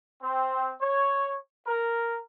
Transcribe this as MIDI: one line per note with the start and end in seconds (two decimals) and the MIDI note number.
0.22 0.72 60
0.80 1.37 73
1.66 2.19 70